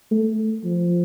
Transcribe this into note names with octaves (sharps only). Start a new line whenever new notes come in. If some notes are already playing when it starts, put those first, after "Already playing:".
A3
F3